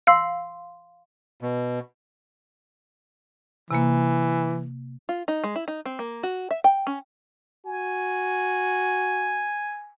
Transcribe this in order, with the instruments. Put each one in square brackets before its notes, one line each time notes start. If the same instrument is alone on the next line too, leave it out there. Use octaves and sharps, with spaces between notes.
[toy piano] F5 C6 [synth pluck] E6 C7
[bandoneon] B2
[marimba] C3 A#3 [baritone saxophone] E3
[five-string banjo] F4
D#4
G#3
E4
D#4
C4
A#3
F#4
E5
G5
C#4
[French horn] F#4 [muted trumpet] G#5